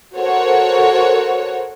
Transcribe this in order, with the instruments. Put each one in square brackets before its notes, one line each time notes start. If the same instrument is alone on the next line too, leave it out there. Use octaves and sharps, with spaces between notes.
[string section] F#4 A4 A#4 C5 C#5 F#5